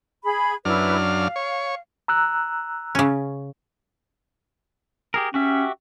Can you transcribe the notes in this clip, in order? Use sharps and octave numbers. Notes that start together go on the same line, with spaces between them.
G#4 B5
F#2 D4 E4 B4 F6
F5
C#5
A#5 E6 F#6
C#3 C#4
G4 G#4 A#4
C#4 F#4 G4 E5